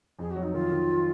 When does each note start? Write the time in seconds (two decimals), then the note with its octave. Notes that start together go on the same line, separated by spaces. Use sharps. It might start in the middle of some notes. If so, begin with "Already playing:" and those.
0.19 F2 G#4
0.30 F#4
0.36 F#3
0.42 D#4
0.54 D#3 F4
0.71 D#3